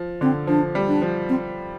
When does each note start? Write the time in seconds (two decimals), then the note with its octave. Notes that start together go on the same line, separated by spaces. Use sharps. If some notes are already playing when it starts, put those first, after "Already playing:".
Already playing: F3
0.21 D3 C4
0.47 F3 D4
0.75 G3
0.88 D4
1.02 F3
1.29 C4